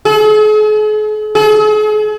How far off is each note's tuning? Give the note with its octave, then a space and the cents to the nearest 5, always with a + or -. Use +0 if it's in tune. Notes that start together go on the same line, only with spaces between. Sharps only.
G#4 +45
G#4 +40